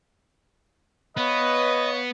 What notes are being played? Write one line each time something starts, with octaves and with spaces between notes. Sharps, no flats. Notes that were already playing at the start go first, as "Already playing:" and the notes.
B3 B4 C#5 D#5 F5 C#6